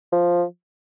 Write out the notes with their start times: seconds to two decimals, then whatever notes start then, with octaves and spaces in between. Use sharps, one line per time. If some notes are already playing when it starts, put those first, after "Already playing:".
0.12 F3